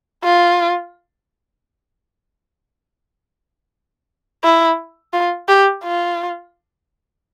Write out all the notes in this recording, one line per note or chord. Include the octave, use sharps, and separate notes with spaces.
F4
E4
F4
G4
F4